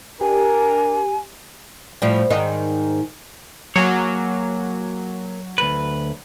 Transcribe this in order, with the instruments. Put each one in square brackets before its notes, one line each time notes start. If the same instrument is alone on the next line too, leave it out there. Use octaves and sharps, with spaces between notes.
[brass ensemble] D4 A#4 [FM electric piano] G4 [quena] G#5
[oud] A2 F3 G3
G#2 D#3 D#4
[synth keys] F#3 [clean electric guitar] A#3 G#4 C#5
[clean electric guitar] D2 B4